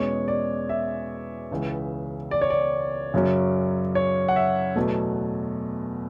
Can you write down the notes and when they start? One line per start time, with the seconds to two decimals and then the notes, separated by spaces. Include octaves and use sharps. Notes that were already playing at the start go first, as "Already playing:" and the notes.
Already playing: E2 B2 G#3 C#4 C#5
0.28 D5
0.69 E5
1.51 C#2 C#3 E3
2.31 D5
2.41 C#5
2.50 D5
3.14 F#2 C#3 F#3 C#4
3.95 C#5
4.28 F#5
4.36 E5
4.76 E2 B2 F#3 A3